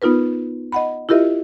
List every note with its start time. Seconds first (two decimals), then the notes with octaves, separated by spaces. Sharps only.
0.02 B3 D#4 F4 A#4 B4
0.72 D#5 F#5 B5
1.09 E4 F4 G4 A#4 D#5 E5